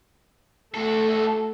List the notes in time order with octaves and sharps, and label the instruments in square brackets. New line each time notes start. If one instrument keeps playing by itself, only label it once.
[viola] A3 [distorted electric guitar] F#4 A4